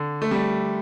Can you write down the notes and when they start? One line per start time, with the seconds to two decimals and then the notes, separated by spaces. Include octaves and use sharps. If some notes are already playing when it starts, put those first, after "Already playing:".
Already playing: D3
0.22 A3
0.31 G3